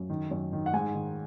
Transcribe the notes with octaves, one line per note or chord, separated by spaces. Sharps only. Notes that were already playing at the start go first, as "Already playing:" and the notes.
Already playing: F#2
D#3
F#2
D#3
F#5
G#2 G#5
D#3